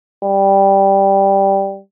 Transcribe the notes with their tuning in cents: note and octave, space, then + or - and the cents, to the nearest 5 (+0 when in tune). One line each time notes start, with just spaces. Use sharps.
G3 +0